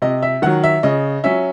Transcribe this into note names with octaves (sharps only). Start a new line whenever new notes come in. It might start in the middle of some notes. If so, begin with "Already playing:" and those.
C3 D#5
E5
D#3 F#3 F#5
E5
C#3 D#5
F#3 C#4 E5